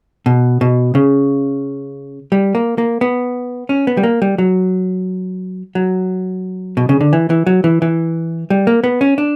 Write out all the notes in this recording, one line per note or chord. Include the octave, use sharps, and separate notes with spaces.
B2
B2
C#3
G3
A#3
A#3
B3
C#4
B3
G3
A#3
G3
F#3
F#3
B2
C#3
D3
E3
E3
F#3
E3
E3
G3
A#3
B3
C#4
D4